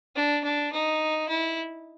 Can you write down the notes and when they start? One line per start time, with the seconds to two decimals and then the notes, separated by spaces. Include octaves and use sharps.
0.16 D4
0.44 D4
0.72 D#4
1.29 E4